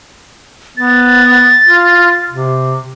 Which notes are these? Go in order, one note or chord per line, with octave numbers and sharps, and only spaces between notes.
B3 A6
F4
C3